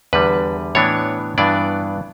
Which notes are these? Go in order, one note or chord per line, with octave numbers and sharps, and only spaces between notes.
E2 D3 G3 B4
A2 E3 B3 D4 C#5
G2 E3 B3 D4 D5